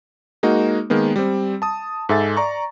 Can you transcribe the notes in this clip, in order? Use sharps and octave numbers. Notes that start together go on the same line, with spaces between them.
G#3 A#3 D#4 F#4
D#3 G#3 A#3 B3
G3 C4
A5 D#6
G#2 A4 E5 G#5 A6
D5 A#5 C#6